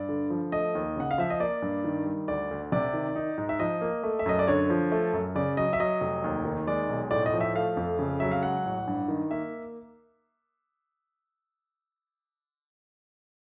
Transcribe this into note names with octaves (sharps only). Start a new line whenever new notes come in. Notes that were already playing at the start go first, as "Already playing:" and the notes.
Already playing: G2 D5
D3
F3
A3 D#5
D#2
C#3 F#5
F5
F3 E5
D#5
A#3 D5
G2
D#3
G3
D2 D5
D2
C3 D5
D#3
D#4
G#2
E5
F3 D#5
A#3
A3
E5
F#2 D#5
D5
D3 C#5
F3
A3
F#2
C#3 D5
F#3 D#5
E5
F#3 D#5
F1
D#2
D#3
G#3 D5
B1
A2 D5
D#5
F3
E5
A3 F5
F2
C#3
F#3 E5
F5
G#3 F#5
A1
G2
D#3
A#3 E5